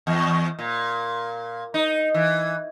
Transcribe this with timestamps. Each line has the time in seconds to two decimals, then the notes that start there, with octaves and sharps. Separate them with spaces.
0.07 E2
0.59 A#2
1.74 D#4
2.14 E3